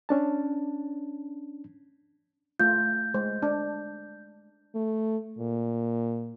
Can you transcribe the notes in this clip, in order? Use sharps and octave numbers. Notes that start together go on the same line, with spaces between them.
C#4 D4 A5
A3 F4 G6
G#3 C5
D4
A3
A#2